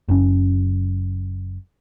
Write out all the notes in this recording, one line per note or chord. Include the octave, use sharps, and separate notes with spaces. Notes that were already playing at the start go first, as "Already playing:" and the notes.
F#1 F#2 C#4